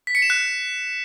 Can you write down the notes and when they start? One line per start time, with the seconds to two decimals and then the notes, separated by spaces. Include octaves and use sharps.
0.07 B6
0.15 C#7
0.22 E7
0.30 F#6